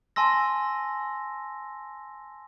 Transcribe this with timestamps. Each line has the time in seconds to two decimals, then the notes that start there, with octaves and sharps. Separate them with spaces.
0.16 G#5 A5 C6 E6 A#6